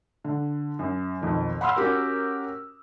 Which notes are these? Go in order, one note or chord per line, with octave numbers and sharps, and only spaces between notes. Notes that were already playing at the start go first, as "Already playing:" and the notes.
D3
F#2
B1 F2 D#3
F#5 B5 C6 E6 F6
C#4 F#4 G4 A#4